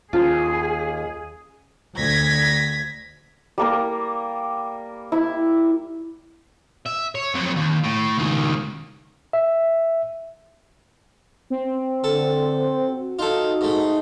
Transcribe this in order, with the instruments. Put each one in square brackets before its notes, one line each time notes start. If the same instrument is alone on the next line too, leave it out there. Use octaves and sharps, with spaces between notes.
[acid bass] D#2 [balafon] C#4 C5 A5 [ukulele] F4 [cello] G#4
[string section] D2 G#6 A#6 B6
[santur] G3 A#3 A#4
E4
[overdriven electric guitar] E5
C#5
F2 F#3
D#2
A2
C#2 D#3
[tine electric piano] E5
[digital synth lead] C4
[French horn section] D3 [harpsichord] A4
[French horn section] F#4
[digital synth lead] D#4 [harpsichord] F4 A4
[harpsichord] G#2 A3